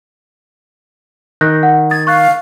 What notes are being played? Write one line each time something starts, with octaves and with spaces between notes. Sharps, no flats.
D#3 F#6 G6 A#6
F#5
D#6 G#6 A6
F5 C#6 F#6 A6